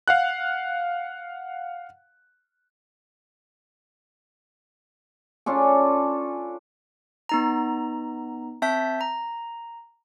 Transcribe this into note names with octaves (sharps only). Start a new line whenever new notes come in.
F5 F#5 F#6
C#4 D4 F4 A4
B3 D#4 A#5
C4 E5 A5 G6 B6
A#5